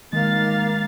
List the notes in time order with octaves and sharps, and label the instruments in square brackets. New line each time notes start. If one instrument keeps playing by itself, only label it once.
[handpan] D#3 [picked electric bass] G#3 [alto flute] A#3 [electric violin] F5 A6